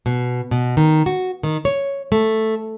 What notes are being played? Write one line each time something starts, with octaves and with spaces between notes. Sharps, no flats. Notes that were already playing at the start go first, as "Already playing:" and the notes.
B2
B2
D#3
F#4
D#3
C#5
A3